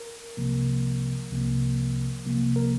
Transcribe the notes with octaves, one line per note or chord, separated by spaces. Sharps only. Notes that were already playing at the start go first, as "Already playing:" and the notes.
Already playing: A#4
C2 C3 F3 A#3
C2 C3 F3 A#3
C2 C3 F3 A#3
A#4